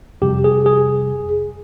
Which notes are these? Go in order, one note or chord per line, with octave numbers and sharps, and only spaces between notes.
F2 C3 G3 G4
G#4
G#4